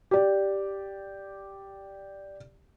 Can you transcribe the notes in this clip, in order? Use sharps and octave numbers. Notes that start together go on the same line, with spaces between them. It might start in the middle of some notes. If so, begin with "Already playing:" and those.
G4 D5